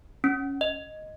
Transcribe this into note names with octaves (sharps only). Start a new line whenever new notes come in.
C#4
D#5